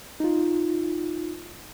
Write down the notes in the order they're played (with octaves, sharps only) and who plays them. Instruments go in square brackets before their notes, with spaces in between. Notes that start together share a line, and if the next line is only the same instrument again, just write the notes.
[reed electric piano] D#4 F4